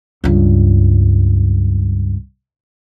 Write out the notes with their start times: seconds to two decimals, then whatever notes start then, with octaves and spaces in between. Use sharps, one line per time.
0.24 C#2 G2